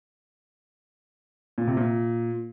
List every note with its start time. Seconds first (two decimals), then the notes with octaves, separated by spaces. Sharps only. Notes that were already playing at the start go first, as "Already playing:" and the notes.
1.58 A#2
1.67 C3
1.77 A#2